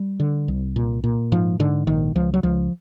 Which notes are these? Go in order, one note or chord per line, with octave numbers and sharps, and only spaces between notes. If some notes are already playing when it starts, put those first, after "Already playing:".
Already playing: G3
D3
C2
A#2
A#2
G#2 F3
G#2 D3
A#1 D#3
C#2 F3
F#3
C#2 F3